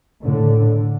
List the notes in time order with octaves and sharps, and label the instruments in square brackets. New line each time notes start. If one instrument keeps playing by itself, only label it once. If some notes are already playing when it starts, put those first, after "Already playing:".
[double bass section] A2 D3